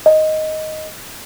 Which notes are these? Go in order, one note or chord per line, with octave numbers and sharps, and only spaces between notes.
D#5